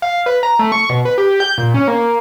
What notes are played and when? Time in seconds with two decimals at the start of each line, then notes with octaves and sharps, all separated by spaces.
0.02 F5
0.26 B4
0.43 A#5
0.59 A3
0.72 C#6
0.90 B2
1.05 B4
1.18 G4
1.40 G6
1.58 A#2
1.74 C#4
1.88 A#3